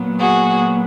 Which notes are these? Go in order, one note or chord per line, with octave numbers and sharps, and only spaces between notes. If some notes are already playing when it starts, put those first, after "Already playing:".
Already playing: A#2 F#3 B3
F#4 G#4